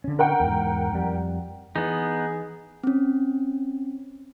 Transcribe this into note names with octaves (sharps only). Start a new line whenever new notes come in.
D3 C#4
A#4 F#5 G5
E2 G#2
F2 G3
E3 B3 D#4 G#4
C4 C#4